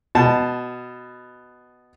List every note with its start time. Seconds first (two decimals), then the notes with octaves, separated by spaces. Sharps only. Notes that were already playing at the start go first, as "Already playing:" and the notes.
0.15 B2 A5